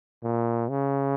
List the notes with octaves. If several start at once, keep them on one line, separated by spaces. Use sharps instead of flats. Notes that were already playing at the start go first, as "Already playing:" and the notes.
A#2
C#3